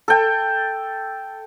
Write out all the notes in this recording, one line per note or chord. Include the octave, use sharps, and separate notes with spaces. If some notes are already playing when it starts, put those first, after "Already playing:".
A4 G5